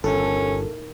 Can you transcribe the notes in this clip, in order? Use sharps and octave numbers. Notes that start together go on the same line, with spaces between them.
G1 A#2 D#3 C#4 E4 A4